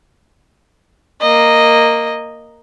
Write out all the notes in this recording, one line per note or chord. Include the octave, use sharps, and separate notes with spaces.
A#3 D#5